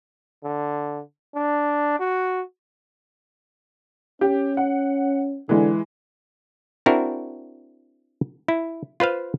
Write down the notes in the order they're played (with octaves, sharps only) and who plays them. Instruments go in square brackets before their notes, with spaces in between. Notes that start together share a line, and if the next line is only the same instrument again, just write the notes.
[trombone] D3
D4
F#4
[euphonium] C#4 [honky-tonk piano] G4
[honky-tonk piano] F#5
[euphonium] D3 [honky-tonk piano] E3 G#3
[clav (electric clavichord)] C4 D4 E4 F#4 A#4
E4
F4 B4 C5 F5